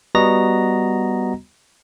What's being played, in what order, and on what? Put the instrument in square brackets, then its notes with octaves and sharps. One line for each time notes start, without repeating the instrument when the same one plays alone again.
[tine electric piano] G3 B3 F#4 D#5 A#5 A#6